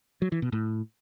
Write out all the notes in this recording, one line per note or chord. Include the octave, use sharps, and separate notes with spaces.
F#3
E3
B2
A2